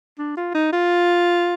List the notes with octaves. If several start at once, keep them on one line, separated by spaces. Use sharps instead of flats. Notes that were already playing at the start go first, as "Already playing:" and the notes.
D4
F4
D#4
F4